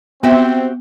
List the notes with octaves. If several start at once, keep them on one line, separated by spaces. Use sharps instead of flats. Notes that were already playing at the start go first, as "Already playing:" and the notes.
B3 C4 F#4 G4 E5